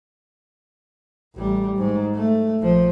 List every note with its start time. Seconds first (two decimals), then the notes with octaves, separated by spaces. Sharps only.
1.36 A1 G3
1.77 G#2
2.15 A3
2.60 A#1 F3